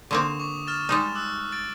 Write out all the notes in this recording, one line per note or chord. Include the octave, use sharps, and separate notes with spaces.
D3 A#3 C4 C#6 D#6 E7
C#6 D6
F6 A6 E7
G3 G#3 D#4
D6 E6 F#6
A6 D7